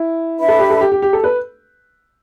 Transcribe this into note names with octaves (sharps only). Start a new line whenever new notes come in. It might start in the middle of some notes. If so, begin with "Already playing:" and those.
Already playing: E4
D4 B4 E5 B5
A4
G4
A4
G4
G4
G4
A4
B4